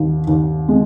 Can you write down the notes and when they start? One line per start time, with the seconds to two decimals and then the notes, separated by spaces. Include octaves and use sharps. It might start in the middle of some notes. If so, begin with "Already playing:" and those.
Already playing: D#2 D#3
0.27 D#2
0.68 G#3